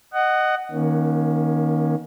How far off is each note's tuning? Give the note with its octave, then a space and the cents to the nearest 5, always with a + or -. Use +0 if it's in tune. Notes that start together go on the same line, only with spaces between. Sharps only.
D#5 -15 F#5 +15
D#3 +0 A#3 +35 C#4 +0